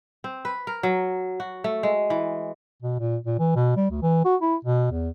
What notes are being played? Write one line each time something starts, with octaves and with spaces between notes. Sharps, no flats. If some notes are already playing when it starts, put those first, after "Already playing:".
C4
B4
A#4
F#3
F#4
A3
G#3
E3
B2
A#2
A#2
E3
B2
G3
D2
E3
F#4
E4
B2
E2